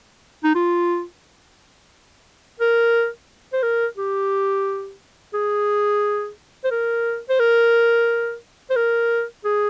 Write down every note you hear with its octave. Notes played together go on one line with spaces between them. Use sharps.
D#4
F4
A#4
C5
A#4
G4
G#4
C5
A#4
C5
A#4
C5
A#4
G#4